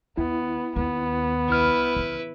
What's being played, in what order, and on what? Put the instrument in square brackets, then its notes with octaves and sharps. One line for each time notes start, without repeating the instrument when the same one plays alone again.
[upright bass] D#2 [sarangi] B3 [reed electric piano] E4
[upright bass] D#2 [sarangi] B3
[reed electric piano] C2 F6 [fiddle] E4 B4
[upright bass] C#3 E3